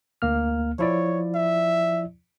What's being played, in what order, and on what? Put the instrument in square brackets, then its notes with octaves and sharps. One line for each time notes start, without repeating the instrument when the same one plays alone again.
[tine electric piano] D2 A#3 F6
[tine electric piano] F3 E4 D5 [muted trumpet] C#5
[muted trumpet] E5